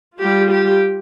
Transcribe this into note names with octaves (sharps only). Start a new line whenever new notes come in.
G3 F4 G4
G4